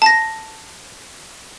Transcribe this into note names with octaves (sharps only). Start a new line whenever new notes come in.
A5 A#6